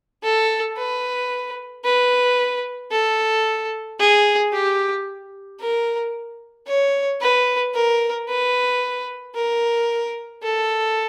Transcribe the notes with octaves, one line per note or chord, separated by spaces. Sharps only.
A4
B4
B4
A4
G#4
G4
A#4
C#5
B4
A#4
B4
A#4
A4